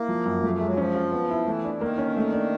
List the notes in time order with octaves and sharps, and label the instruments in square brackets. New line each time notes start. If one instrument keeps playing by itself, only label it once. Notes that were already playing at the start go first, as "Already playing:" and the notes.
Already playing: [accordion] A#3 [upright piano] E4
[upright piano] F3
F#2
[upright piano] F3 [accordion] A3
[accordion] A3
[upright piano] G#3
[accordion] F#3
[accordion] F3 [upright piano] C#4
[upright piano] F4
B3
E4
[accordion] E3 [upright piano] A3
[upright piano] D4
[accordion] E3
[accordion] D#3 [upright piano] A#3
[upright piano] C#4
A3
D4